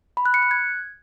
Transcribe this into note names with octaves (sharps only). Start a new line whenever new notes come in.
B5
F#6
C#7
F#6
G#6